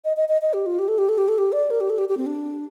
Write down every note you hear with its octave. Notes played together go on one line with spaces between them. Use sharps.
D#5
D#5
D#5
D#5
G4
F4
G4
A4
G4
A4
G4
A4
G4
D5
A#4
G4
A4
G4
G4
C4
D4